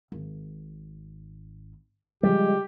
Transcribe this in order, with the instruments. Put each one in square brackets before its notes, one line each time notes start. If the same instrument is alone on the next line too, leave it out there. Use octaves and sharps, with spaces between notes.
[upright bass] G#1
[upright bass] C#3 F3 [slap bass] G3 G#3 [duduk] G4